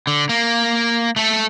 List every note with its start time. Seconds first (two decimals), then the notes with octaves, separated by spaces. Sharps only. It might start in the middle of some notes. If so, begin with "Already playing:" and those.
0.07 D3
0.29 A#3
1.16 A3 A4